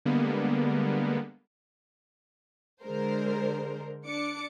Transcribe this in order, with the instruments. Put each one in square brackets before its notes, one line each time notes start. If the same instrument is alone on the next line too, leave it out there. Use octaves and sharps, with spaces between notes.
[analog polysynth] D3 G3 G#3 A#3 B3
[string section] D3 G#3 A#4 C5
D4 D6 C#7